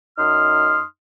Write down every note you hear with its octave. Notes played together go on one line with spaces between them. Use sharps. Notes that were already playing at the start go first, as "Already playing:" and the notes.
F#2 D#4 C6 D#6 F6